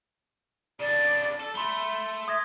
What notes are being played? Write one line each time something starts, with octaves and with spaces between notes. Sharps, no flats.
C#3 D4 D5
A4
A3 B5 C6 G7
E5 D#6 G#6 A#6